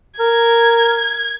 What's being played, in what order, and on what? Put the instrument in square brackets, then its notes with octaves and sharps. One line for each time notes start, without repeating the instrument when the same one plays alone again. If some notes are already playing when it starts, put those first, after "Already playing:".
[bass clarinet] A#4 [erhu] G#6